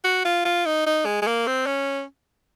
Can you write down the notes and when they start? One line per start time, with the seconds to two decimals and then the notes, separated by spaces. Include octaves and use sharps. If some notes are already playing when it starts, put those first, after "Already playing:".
0.04 F#4
0.25 F4
0.45 F4
0.66 D#4
0.86 D#4
1.05 G#3
1.22 G#3
1.27 A#3
1.47 C4
1.66 C#4